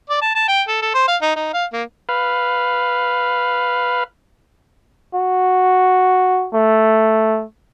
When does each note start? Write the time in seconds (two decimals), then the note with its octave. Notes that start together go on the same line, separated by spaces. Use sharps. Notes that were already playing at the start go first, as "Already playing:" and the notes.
0.10 D5
0.22 A5
0.35 A5
0.48 G5
0.68 A4
0.82 A4
0.94 C5
1.08 F5
1.22 D#4
1.36 D#4
1.53 F5
1.73 A#3
2.09 B4 F5
5.15 F#4
6.54 A3